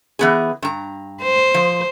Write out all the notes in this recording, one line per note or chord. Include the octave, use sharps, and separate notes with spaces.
E3 B3 G#4
G2 A#5
C5
F3